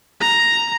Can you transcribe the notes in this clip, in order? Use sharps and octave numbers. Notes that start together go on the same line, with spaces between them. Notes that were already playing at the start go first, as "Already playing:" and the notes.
A#5